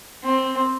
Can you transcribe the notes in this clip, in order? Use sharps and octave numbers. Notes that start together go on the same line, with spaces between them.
C4